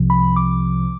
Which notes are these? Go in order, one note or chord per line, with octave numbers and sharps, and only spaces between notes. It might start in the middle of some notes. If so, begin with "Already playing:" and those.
Already playing: C2 C3 F3
B5
D6